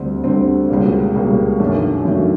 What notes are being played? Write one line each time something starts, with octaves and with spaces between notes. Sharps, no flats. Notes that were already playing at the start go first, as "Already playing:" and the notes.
Already playing: D2 D3 G3 C4
D2 D3 G3 C4
C#2 B2 G3 A#3
C#2 B2 G3 A#3
F#2 D#3 F#3 A3 D4
F#2 D#3 F#3 A3 D4